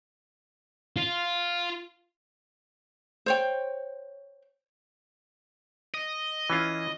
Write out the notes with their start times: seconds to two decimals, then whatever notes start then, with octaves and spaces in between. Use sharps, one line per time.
0.96 F4
3.26 C5 C#5 G5
5.94 D#5
6.50 E3 C#4 F4